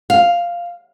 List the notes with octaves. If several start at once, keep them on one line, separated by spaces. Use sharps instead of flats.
F5